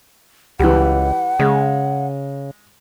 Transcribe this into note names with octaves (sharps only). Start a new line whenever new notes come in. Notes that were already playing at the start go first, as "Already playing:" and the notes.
C#2 E3 G3 F#5
C#3 G#3